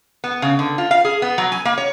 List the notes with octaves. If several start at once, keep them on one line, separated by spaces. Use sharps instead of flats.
B3
C#3
D3
F4
F5
G#4
B3
F#3
G#5
A#3
C#5